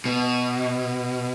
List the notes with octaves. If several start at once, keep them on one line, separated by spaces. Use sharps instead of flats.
B2